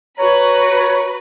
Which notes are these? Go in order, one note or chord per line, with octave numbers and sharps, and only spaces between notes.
F#4 B4 C#5 A#5 B5